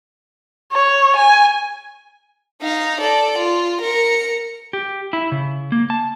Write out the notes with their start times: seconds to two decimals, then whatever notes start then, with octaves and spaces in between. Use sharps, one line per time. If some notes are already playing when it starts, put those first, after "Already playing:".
0.72 C#5
1.16 G#5
2.61 D#4 F5
3.00 A4 D5
3.38 F4
3.81 A#4 C#7
4.73 G4
5.13 E4
5.32 C#3
5.72 A#3
5.90 A5